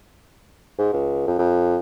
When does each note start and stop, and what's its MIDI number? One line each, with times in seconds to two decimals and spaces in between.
0.79 0.88 44
0.93 1.24 37
1.27 1.37 41
1.39 1.78 41